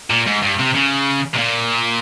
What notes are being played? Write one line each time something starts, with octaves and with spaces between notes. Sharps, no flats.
A#2
G#2
G2
C3
C#3
C3
A#2